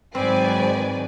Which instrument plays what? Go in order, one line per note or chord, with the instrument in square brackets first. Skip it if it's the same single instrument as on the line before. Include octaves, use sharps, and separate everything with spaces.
[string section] G#2 D#3 F#3 [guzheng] C4 [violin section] B4 D5 G#5 [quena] C5